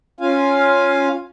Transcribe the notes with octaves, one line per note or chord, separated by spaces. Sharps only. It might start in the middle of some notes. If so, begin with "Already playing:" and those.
C#4 F4 F5 G#5